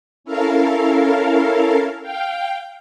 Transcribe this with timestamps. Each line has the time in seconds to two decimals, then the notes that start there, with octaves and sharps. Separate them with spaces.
0.24 C#4 E4 A4 A#4 F5
2.02 F5 G5